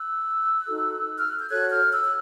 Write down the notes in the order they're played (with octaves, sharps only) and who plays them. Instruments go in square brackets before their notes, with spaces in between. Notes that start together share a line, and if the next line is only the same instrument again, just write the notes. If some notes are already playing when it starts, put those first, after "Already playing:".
Already playing: [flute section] E6 F#6
D#4 F#4 A4
F6
F#6
G6
F#4 A4 C#5 F#6 G#6
F6 G6
E6 F#6
F#6